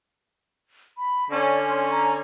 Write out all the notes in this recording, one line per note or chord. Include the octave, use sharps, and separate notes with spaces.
B5
D3 C#4 D5
C6
A#5